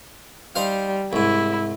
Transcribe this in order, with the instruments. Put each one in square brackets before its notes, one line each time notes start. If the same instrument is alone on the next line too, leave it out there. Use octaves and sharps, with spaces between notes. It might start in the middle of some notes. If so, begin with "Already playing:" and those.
[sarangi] G3 [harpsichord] D#4 C5 F5
[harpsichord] C2 G#2 [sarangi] E4